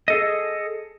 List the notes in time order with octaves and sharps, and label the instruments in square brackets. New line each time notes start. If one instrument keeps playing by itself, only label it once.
[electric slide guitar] G#4 A4 D#5